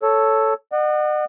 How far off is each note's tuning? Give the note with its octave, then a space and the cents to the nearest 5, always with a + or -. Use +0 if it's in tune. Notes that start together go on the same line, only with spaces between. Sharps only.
A4 +0 C#5 +0
D#5 -45 F#5 +0